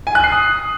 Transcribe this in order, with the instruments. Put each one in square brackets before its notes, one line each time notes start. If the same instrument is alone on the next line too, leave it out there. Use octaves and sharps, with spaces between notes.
[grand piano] G#5
F#6
C7
D#6